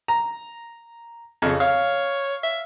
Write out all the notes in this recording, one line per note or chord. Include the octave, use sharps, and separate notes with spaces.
A#5
F2 C#3
C#5 F5
E5